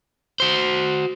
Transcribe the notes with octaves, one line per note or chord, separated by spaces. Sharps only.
F#4 C5